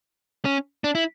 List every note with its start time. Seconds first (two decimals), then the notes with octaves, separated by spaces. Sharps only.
0.45 C#4
0.84 D4
0.95 E4